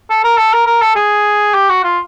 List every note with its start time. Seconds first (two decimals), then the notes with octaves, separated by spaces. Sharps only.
0.10 A4
0.24 A#4
0.38 A4
0.53 A#4
0.66 A#4
0.82 A4
0.96 G#4
1.54 G4
1.69 F#4
1.84 F4